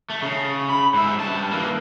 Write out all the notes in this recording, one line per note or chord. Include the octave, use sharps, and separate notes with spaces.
A3
C#3
B5
G#2 E5
G2 A5
E3 A#3